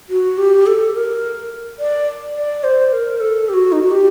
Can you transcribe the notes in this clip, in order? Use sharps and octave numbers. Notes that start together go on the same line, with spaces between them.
F#4
G4
A4
A#4
D5
D5
C5
A#4
A4
G4
F#4
D#4
F#4
G4